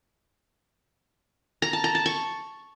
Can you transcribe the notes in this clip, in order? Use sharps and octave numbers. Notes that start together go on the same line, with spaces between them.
A#5
A5
A#5
A5
C#6